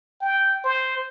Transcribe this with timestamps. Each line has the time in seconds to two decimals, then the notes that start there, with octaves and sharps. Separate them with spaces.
0.21 G5
0.64 C5